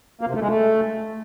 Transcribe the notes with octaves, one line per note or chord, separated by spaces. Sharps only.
A#3
C3
A3
G#3
A3